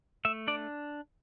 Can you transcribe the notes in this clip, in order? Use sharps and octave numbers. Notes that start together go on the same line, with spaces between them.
A3 E5
D4 D5